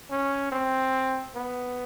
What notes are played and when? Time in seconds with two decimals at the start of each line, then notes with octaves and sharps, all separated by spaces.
0.10 C#4
0.52 C4
1.35 B3